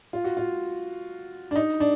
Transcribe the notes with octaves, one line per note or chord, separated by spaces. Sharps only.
F4
F#4
F4
D4
D#4
D4